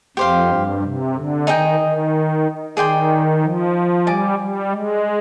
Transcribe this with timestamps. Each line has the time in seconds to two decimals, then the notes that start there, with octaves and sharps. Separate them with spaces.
0.17 F2 G4 C5 F5
0.49 G2
0.82 C3
1.15 D3
1.47 D#3 D#4 G#4 D#5 G5
1.79 D#3
2.77 D#3 G#4 D5 G5 C6
3.42 F3
4.07 G3 D5 G#5 D6
4.39 G3
4.71 G#3